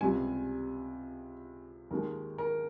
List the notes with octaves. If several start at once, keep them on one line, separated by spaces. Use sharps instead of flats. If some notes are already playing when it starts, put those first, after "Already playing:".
C#2 C3 G3 G#5
D#2 D#3 G#3 A#4
A#4